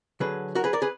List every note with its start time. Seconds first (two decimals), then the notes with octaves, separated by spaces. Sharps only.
0.20 D3 F#3 G#4 B4
0.55 F#4 A#4
0.64 G#4 B4
0.73 A#4 D5
0.82 G#4 B4